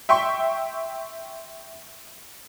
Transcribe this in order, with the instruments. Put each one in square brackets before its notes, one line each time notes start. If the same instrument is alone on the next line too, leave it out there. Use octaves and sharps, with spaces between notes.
[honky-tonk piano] E5 G5 C6 C#6